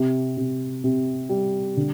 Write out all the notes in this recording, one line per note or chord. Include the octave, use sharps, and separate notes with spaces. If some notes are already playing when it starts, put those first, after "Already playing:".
Already playing: C3
C3
C3
G3
D3